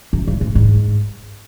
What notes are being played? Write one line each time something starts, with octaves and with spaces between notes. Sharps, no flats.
F#2
G2
A2
G#2